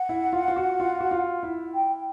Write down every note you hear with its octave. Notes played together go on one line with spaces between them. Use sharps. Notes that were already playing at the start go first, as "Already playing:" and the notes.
Already playing: F#5
E4
F4
F4
F#4
F4
F#4
F4
E4
G5